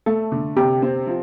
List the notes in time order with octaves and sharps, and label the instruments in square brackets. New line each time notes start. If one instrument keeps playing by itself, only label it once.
[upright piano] A3 [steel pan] A4
[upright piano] D3
[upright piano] C3 [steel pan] G4
[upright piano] C4
F3